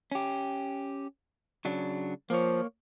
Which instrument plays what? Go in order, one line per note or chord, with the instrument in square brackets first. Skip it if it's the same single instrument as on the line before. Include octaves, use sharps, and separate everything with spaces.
[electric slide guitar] C#4 G4
C#3 F#3 D4
[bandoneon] F3 [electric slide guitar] A#3 C#5